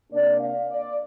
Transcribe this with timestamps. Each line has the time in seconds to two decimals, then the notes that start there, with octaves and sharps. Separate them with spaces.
0.12 C3 A#3 D4 D5
0.40 F5
0.70 D5